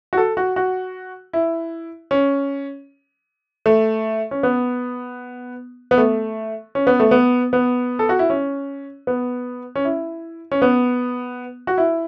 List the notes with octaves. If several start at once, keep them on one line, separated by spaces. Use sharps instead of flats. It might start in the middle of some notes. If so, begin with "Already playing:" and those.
F#4
A4
F#4
F#4
E4
C#4
A3
C#4
B3
B3
A3
C#4
B3
A3
B3
B3
A4
F#4
E4
C#4
B3
C#4
E4
C#4
B3
F#4
E4